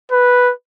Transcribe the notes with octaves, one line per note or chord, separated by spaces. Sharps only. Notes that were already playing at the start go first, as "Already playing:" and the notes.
B4